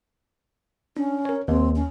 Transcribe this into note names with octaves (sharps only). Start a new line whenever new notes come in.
C#4 D4
A#4 C#5
D#2 C4
C#4